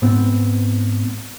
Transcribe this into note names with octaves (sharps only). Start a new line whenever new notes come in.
G#2 B3 C4